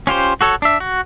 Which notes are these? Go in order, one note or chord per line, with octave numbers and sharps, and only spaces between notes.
C#4 F4 G4 C5
F#4 A4 C#5
D4 E5
F#4